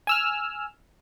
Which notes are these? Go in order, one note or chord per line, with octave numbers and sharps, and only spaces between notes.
G#5 E6 F6